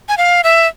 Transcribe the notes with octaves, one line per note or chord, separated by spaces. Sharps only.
G#5
F5
E5